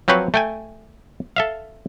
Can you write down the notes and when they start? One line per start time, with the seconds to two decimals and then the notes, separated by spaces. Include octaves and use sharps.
0.08 F3 F#3 C4 B4 C#5
0.34 A3 G5 G#5
1.36 A4 E5 F5